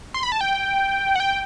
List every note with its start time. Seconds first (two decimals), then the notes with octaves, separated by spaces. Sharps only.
0.14 C6
0.23 B5
0.32 A5
0.41 G5
1.16 F#5
1.20 G5